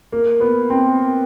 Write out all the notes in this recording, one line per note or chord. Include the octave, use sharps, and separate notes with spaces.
A#3
B3
C4